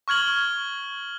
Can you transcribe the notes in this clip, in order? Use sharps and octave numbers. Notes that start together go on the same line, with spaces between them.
C#6 F6 G#6 F#7 G7